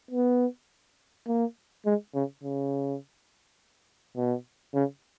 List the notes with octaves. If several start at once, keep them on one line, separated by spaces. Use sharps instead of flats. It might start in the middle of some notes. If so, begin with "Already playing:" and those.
B3
A#3
G#3
C#3
C#3
B2
C#3